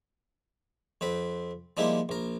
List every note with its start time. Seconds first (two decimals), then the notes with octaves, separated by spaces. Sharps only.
1.01 F2 C4 B4
1.77 F3 G3 G#3 A#3 D#4 E4
2.09 A#1 A#4